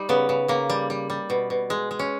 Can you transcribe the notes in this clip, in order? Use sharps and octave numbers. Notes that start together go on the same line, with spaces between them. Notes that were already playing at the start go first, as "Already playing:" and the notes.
Already playing: G3 D#4
C#3 B3
C#3
C#3 A#3
G3
G3
G3
B2
B2
G#3
G#3
C#4